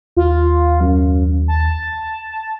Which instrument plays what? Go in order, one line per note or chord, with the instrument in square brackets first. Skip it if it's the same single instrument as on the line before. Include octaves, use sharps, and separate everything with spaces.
[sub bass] D#2 [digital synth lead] F4
[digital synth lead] F#2
A5